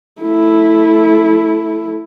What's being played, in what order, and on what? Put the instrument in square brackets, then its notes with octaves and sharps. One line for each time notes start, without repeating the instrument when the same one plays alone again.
[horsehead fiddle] A3 E4